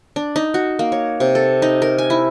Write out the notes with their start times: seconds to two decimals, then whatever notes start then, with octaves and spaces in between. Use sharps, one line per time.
0.16 D4
0.36 D#4
0.54 F#4
0.79 A#3
0.92 C#5
1.20 C3
1.35 A4
1.62 D#4
1.82 A#4
1.98 G#5
2.10 E4